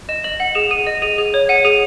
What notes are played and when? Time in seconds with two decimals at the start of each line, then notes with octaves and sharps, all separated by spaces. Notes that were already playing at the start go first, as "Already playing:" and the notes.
0.09 D#5 E7
0.24 D#5 F#7
0.40 F#5 F#7
0.55 G#4 E7
0.71 G#4 D#7
0.87 D#5
1.02 G#4 D#7
1.18 G#4
1.34 C#5
1.49 F#5 D#7
1.65 G#4 D#7